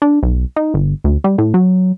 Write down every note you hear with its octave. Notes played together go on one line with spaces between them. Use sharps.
D4
B1
D#4
G1
D2
G3
A2
F#3